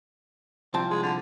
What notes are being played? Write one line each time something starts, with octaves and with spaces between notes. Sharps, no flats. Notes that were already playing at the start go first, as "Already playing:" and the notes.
C2 F3 C4 A5
G#3
D3